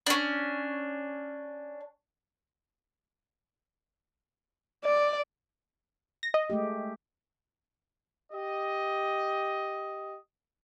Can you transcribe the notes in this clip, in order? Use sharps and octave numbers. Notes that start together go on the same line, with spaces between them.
C#4 D4
D5
A#6
D#5
G#3 A3 G4
G4 D#5